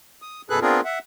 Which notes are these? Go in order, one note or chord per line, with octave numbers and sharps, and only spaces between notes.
D#6
F#2 B2 G#4 A4 B4 F#6
B3 C4 D4 F4 G#4 A#4
E5 F#5